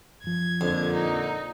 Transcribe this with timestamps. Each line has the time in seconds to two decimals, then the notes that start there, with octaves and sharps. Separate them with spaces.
0.24 F#2 F3 G#6
0.61 F2 A#2 D3
0.93 D#4